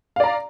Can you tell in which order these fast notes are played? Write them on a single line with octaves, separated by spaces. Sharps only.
F5 D5 A#5